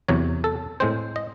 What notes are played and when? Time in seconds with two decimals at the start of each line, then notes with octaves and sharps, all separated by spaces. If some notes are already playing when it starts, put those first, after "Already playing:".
0.08 E2 C3 F#3 C#5
0.44 A4
0.80 A2 G#3 C4 C5
1.16 D#5